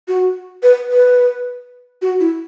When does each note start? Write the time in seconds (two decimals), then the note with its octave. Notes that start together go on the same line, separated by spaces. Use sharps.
0.08 F#4
0.63 B4
0.91 B4
2.02 F#4
2.20 E4